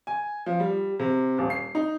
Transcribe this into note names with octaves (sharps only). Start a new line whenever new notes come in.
G#5
F3
G3
C3
D#1
C7
D#4